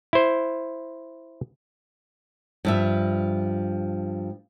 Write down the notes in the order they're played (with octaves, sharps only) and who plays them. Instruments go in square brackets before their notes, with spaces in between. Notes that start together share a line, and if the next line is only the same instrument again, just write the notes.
[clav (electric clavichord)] E4 C5
[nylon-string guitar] G2 F3 E5